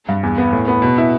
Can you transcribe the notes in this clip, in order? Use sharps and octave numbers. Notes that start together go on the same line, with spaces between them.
G2
E2
B3
A2
B3
B2
E4